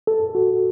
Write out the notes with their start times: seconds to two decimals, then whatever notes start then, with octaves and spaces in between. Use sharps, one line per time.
0.07 A4
0.35 F#4